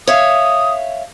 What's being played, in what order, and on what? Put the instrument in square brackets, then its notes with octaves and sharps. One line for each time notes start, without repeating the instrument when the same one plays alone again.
[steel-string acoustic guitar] C#5 E5 F5 [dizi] D#6